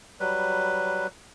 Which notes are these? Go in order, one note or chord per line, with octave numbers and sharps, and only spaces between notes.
F#3 G3 B4